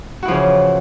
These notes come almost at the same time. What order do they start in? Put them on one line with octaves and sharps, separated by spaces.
F#4 E4 F3 C#3 E3